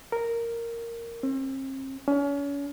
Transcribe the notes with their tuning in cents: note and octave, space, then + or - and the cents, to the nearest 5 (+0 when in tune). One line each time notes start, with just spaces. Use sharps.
A#4 -5
C4 +40
C#4 +35